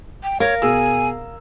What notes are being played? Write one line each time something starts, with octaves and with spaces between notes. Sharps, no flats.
G5
A#4 C#5 F5
B2 G#4 G#5 E6